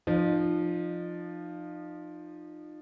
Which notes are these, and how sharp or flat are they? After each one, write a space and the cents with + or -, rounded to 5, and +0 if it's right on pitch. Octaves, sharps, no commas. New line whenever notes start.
F3 +0 D#4 -35